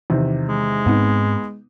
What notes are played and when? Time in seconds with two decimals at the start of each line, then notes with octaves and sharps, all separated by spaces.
0.10 E2 C3 D#3
0.49 G#3
0.86 G#2 B3 C4 D#4